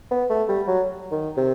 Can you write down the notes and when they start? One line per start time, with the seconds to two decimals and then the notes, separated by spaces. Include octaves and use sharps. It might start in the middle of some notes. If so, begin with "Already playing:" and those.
0.11 B3
0.29 A3
0.48 G3
0.67 F#3
1.11 D#3
1.37 C3